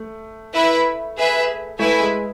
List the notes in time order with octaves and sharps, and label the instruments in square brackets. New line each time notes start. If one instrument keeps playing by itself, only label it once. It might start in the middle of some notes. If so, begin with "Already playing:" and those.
Already playing: [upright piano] A3
[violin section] E4 B4 E5
G#4 B4 E5
[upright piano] A3 [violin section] E4 B4 E5 G#5
[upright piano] G#3